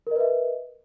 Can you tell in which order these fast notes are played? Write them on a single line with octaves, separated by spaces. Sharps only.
A#4 D#5 B4 E5